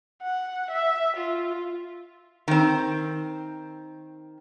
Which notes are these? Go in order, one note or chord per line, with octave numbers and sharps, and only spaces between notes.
F#5
E5
F4
D#3 C4